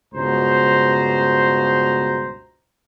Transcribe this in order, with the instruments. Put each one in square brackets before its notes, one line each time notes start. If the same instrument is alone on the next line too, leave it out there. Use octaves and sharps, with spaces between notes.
[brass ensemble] C#2 G2 B2 C5 A#5